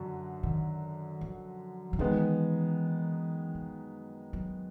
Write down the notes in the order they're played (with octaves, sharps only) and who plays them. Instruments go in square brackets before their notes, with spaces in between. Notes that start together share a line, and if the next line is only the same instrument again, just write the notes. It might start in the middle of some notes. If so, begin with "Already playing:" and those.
Already playing: [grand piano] F#2 D3 F#3
[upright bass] D#3
F3
F3
[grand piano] D#3 G#3 B3 [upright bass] E3
[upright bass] F3
F#3